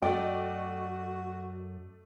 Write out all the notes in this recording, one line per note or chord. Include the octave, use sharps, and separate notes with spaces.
F#2 A3 F#4 D5 D#5 G5